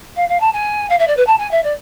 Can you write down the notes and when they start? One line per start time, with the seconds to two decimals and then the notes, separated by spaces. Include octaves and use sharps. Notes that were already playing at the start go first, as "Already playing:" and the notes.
0.16 F5
0.29 F5
0.40 A5
0.53 G#5
0.90 F5
0.99 E5
1.08 D5
1.17 B4
1.27 A5
1.38 G#5
1.51 E5
1.64 D5